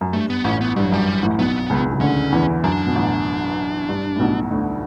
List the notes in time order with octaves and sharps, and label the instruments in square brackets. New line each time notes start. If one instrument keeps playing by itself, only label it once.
[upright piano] F#2
[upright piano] G2 [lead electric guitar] A3
[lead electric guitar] B3
[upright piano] A1 A2 [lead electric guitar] C#4
[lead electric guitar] B3
[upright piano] G2 [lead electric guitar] G3
[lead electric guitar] F#3
[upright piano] F#2 [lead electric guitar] G3
[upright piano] A1 A2
[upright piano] B1 B2 [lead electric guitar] B3
[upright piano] C#2 C#3
C#3
[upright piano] D2 D3 [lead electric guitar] C#4
[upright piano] E2 E3
[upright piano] F#2 [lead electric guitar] D4
[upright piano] B2
A1 A2
G2
A2
B1 B2
D2 D3